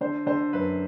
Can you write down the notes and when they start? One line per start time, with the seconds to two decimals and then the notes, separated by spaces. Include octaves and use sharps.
0.01 D3 C5
0.26 D3 C5
0.53 F#2 B4